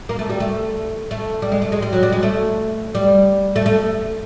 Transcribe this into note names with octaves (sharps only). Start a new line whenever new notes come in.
A#3
A3
G3
A3
A3
G3
G#3
A3
G#3
G3
F#3
G3
G#3
A3
G3
A3
A3